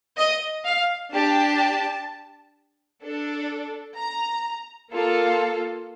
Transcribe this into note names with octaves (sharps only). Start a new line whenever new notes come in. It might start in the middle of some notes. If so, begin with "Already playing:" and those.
D#5
F5
D4 G4 A5
D4 A4
A#5
A#3 F4 A4